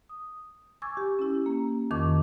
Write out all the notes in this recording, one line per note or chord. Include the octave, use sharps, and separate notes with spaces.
D#6
G#5 C#6 D6 E6 G#6 A6
G4
C#4 E4
A#3
F2 D#3 A#4 C#6 D6